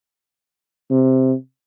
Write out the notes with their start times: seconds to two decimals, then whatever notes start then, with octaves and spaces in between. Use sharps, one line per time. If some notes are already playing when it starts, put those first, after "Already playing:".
0.91 C3